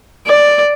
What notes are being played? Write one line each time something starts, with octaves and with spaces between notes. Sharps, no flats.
D5